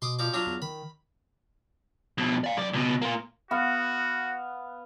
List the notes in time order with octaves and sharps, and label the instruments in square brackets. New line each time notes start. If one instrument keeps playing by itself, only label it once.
[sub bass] B2 [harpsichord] C6 D6 D#6
[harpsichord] F3 D5 D6
F#3 D4 F4
[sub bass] E2
[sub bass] D#3 [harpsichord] B5
[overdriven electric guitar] F2 B2
D5 F5
F#2 D5
C#2 B2
A#3 F4
[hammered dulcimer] B3 F5 [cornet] F#4